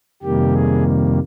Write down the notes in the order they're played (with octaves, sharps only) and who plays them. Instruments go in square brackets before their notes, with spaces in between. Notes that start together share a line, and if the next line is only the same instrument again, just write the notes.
[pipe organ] F2 C3 D#3 G3 A#3 G4
G#4